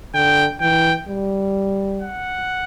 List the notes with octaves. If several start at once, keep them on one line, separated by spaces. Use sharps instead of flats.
D3 G5
E3 G5
G3
F#5